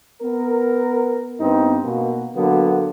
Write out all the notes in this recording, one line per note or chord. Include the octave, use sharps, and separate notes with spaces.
B3 A#4
G2 B3 C4 D#4
B2 A#3
D3 F#3 A#3 B3